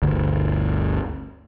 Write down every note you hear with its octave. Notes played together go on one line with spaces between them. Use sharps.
G1 D2